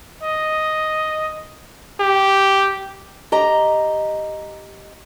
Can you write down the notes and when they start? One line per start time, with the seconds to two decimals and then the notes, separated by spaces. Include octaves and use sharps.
0.23 D#5
2.00 G4
3.32 G4 D#5 A#5